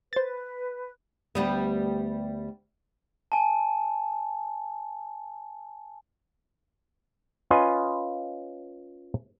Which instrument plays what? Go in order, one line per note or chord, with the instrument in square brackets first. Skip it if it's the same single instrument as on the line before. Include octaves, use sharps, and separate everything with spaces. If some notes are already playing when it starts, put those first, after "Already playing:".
[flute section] B4 [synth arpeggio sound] C5 A6
[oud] D2 G3 B3
[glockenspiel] G#5 A5
[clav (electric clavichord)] C#4 F4 B4 D#5 G#5